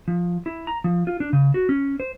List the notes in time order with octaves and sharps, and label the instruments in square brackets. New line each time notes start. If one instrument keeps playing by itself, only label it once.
[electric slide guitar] F3
E4
A#5
F3
F4
D4
C#3
F#4
C#4
C5